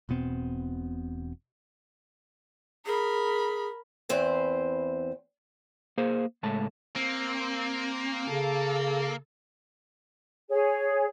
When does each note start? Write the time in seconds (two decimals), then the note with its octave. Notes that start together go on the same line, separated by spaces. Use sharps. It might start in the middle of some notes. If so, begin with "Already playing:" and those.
0.09 E1 B2 B3 C4
2.86 G#4 A#4 B5
4.09 E2 E3 C4 B4 C5
5.98 A#3 G#4 C5
6.43 C#2 A2 G#3 A3 A5
6.96 A#3 C4
8.28 C#3 A4
10.49 G#4 C#5